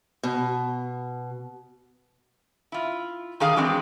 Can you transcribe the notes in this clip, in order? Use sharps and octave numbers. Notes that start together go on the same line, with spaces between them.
B2
E4 F4
D#3 D4 G#4 F5
E3 F#3 G#3 C4 D4